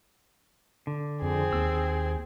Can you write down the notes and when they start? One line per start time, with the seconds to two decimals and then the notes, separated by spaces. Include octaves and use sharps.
0.87 D3
1.22 F2 C4 G#4
1.53 D#2 E6